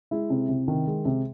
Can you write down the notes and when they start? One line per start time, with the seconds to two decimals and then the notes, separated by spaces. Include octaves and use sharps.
0.11 G#3 E4
0.30 C3
0.49 C3
0.68 D#3
0.87 G#3
1.05 C3